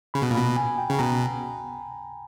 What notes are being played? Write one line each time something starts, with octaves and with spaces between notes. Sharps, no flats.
C#3 B5
B2
A#2
B5
B2
G#5
G5
C#3
B2 A#5